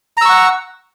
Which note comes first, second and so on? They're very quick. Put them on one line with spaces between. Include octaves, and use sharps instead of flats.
A#5 E6 C#6 F#5